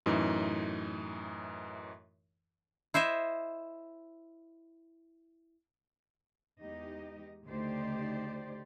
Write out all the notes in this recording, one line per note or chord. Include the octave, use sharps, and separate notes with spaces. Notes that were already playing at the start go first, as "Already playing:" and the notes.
F#2 A2 E3 D#4
E4 C5 D#5 E5
E2 G#3 D#4 G4 D#5
D2 C#3 D#4 G4 C5 D5